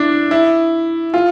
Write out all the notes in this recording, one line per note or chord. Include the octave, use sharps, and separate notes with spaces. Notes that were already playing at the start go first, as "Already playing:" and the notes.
Already playing: D4 E4
E4
F4